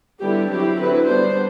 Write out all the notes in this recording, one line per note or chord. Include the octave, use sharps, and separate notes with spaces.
D3 G3 B3 E4 G4
F#3 C4 E4 G4
D3 F#3 C4 E4 B4
G3 B3 D4 C5